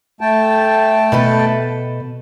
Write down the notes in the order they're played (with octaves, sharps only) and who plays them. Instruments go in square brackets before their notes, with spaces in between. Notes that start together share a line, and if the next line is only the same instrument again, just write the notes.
[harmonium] A3 G5 A5
[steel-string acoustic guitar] B2 A4 B4